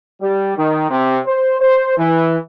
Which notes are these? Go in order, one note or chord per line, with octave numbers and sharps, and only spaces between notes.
G3
D#3
C3
C5
C5
E3